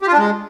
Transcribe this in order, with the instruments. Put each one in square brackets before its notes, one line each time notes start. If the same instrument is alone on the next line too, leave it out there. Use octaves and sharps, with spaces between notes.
[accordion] G4
F4
D4
G#3